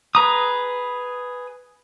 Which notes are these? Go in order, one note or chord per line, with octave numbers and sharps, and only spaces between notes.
G#4 B4 A#5 D#6